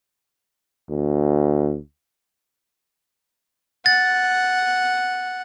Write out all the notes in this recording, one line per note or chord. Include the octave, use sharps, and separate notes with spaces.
D2
F#5 A6